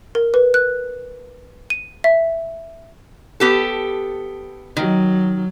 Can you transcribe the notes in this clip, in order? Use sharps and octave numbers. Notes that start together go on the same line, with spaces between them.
A#4
B4
F#6
D#7
E5
B3 G4 A4
D#3 F#3